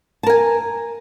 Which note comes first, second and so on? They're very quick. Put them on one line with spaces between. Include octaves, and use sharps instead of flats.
A5 A#4 G#5